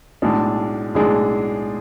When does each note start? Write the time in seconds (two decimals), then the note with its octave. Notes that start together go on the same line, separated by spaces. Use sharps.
0.22 B1 A2 G#3 D4 G#4
0.95 B1 A2 G#3 D4 G#4